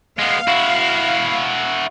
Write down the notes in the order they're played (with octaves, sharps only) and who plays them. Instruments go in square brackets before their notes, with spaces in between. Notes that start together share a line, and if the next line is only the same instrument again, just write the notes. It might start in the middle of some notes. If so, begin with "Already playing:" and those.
[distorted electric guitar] G#3 B3 [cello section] F5
[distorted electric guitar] E4 F#4